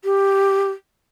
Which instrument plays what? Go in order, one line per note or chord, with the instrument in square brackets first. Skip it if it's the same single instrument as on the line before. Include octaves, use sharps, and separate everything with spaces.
[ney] G4